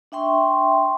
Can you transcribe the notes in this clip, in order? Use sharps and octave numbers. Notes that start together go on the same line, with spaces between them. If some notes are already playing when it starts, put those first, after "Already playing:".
D4 E5 G5 C6 C#6